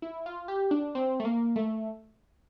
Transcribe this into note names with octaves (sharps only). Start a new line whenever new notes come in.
E4
F4
G4
D4
C4
A3
A#3
A3